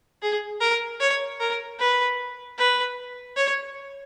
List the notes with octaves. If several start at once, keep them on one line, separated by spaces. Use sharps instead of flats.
G#4
A#4
C#5
A#4
B4
B4
C#5